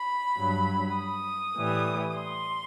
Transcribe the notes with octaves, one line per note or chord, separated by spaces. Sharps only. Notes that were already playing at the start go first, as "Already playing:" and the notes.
Already playing: B5
G2 F#3
D#6
A2 E3 G3
C6